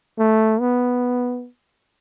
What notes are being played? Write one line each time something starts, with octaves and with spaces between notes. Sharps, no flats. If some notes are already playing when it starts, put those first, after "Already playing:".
A3
B3